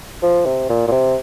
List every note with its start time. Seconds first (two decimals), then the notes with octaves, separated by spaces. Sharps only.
0.23 F3
0.45 C3
0.69 A#2
0.88 A#2
0.92 C3